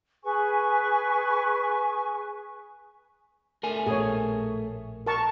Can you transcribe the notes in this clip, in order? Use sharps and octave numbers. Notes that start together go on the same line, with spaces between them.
G#4 B4 G#5 C#6
A3 A#4 G#5
A#1 A2 G#4 C#5
A#4 A5 C#6